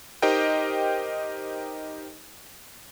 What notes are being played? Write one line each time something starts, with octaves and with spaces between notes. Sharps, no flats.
D#4 G4 A#4 C5 D#5 G5